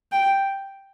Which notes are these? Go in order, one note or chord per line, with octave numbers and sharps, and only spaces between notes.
G5